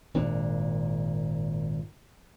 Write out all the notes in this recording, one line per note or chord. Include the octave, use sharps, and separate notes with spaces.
G#1 A#2 D4